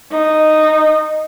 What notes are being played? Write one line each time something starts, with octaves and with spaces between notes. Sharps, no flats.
D#4